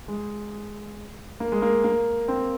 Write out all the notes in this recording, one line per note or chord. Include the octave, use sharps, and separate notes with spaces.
G#3
A#3
G#3
A#3
A#3
C4